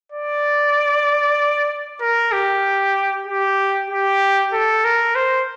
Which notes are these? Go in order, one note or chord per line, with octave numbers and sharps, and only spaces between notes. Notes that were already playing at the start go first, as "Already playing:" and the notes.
D5
A#4
G4
G4
G4
A4
A#4
C5